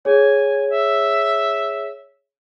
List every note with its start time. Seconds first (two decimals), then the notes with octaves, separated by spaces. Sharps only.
0.05 G#4 C#5 G#5
0.70 E5